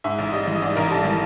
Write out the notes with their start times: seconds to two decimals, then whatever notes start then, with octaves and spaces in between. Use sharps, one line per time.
0.04 G#2 E5
0.19 A1
0.32 G3 D#5
0.47 E3
0.55 D#5
0.62 G#2 D5
0.76 A1 A#4
0.91 G3 A4
1.05 E3 A4